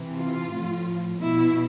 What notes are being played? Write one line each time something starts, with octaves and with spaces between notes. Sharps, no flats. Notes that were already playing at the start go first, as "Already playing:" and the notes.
Already playing: C3 E3
F4
A2 F3
B2 E4